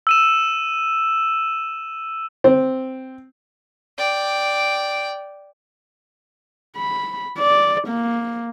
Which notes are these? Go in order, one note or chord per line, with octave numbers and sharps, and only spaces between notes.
E6 D#7 E7
C4
D5 G5
B5
D5
A#3